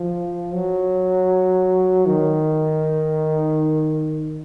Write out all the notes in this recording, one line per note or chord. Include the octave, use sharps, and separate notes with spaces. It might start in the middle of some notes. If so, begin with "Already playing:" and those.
Already playing: F3
F#3
D#3